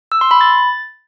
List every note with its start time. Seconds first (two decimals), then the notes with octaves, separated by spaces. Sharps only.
0.12 E6
0.21 C6
0.31 B5
0.41 A6